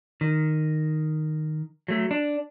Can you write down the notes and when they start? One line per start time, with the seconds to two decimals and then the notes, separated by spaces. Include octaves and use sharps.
0.21 D#3
1.88 F#3 A3
2.11 D4